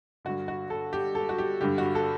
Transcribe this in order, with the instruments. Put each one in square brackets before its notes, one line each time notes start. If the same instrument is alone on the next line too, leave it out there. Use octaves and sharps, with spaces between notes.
[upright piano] G2 D3 F#4
F#4
A4
G4
A4
F#4
G4
G2 D3 G4
F#4
A4